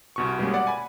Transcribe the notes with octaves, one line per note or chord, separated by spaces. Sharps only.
C2 B2 C#6
B2 G3 G#3 A#3 C#4
D5 F#5
G#5 B5